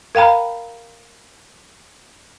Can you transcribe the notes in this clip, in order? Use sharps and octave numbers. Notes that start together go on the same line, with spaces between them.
A#4 F5 G5 A#5 B5